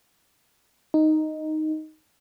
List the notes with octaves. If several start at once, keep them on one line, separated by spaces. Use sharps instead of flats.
D#4